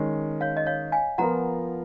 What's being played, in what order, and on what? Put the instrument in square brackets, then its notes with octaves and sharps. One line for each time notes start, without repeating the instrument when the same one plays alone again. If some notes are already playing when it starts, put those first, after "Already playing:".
Already playing: [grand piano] D#3 G#3 C#4
[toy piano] C#5 F5
D#5
C#5 F5
F5 G#5
[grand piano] F3 B3 F4 A#4 [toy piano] F#5 A#5